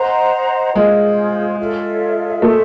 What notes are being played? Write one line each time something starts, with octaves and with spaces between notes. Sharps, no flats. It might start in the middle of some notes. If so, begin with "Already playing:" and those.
Already playing: C5 D#5 F#5 A#5
G#3 F4 G#4 C5
F4 A4 C#5 E5
A3 G#4 C5 E5 A5